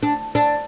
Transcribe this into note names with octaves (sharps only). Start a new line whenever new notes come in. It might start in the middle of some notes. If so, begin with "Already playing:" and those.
D4
D4